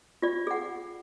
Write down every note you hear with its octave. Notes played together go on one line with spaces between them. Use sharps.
F4 D5
G#4 F#5